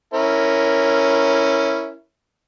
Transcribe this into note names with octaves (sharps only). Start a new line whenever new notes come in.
C#4 E4 A#4